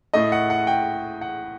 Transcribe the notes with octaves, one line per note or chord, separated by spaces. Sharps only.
A2 A3 D#5
F#5
F#5
G5
F#5